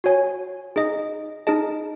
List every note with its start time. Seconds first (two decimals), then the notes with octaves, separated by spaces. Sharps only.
0.04 F#4 C#5 G#5
0.76 D#4 G#4 D#5
1.47 D#4 G#4 D#5 A5